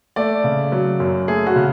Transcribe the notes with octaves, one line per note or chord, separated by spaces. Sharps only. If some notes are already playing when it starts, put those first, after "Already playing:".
A3 D5
C#3
F#3
F#2
A3 G#4
F#4
C#3